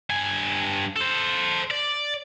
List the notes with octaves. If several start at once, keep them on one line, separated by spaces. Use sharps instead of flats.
G2 G#5
A4 C5
D5